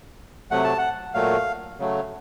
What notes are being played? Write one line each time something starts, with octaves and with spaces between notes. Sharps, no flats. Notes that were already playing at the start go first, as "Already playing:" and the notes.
C3 F#3 A3 F#5
A5
F#5
A#2 F#3 A3 F5
C#3 F#3 A3